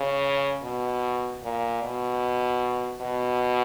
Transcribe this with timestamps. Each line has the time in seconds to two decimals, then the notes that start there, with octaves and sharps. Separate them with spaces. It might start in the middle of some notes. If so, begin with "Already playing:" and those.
Already playing: C#3
0.63 B2
1.42 A#2
1.82 B2
3.01 B2